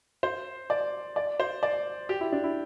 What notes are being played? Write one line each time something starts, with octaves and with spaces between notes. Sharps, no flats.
C5
D5
D5
C5
D5
G4
E4
D4
E4